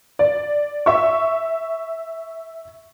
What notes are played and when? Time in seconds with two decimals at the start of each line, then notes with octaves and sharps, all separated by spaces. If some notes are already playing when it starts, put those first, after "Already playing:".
0.19 D5
0.86 E5 C#6